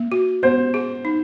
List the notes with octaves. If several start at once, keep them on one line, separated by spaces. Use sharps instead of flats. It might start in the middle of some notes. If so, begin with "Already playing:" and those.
Already playing: A#3
F#4
B3 C5
G#4
D#4